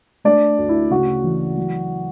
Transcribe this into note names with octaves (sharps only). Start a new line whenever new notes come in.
A3 D4 D5
D2
E4
C#3 F#4
E3
F#3